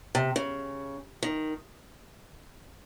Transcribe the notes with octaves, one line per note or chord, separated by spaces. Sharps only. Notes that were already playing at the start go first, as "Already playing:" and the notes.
C3
C#3
D#3